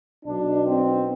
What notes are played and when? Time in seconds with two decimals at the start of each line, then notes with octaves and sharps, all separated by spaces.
0.25 B1 B2 D4
0.66 C4